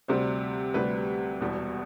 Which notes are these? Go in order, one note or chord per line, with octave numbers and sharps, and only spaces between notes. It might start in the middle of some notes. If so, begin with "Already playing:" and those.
D2 C3 G3 C5
D2 C3 G3 B4
E1 E2 B2 G3